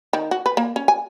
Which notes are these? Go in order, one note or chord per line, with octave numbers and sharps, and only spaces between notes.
D#3
F#4
B4
A#3
C#4
G#5